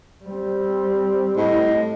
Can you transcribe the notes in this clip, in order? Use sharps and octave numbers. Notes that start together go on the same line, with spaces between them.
G3 C4
A2 D#5